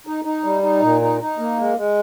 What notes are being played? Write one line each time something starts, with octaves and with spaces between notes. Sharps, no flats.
D#4
D#4
G3
D#4
A#2
D#4
D#4
A#3
G#3
G#3